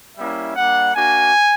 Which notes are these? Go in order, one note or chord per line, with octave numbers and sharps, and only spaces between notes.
G3 A#3 C#4 E4 E5
G3 A#3 D4 F#5
A#3 D4 F#4 G#5